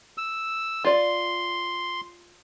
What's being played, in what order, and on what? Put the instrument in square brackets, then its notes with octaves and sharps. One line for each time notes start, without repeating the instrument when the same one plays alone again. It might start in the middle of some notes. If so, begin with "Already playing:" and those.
[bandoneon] E6
[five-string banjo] F4 D5 [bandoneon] C6